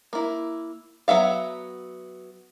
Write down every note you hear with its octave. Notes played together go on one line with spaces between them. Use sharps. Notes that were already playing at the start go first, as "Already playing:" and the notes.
A#3 E4
F#3 B3 E5 F5